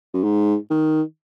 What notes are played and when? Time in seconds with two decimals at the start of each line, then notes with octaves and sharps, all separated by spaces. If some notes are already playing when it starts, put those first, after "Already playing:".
0.14 F#2
0.24 G#2
0.70 D#3